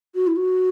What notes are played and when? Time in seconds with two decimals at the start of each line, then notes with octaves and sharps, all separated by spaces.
0.15 F#4
0.27 E4
0.36 F#4